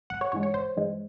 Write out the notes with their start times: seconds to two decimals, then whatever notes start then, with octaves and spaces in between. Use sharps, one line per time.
0.10 G#1 F#5
0.21 C#5
0.32 G2 E3 G#3 C#5
0.43 C#5
0.54 G#1 C5
0.77 G2 E3 G#3